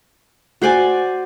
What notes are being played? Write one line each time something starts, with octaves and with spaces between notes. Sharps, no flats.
F#4 C5 D5 G#5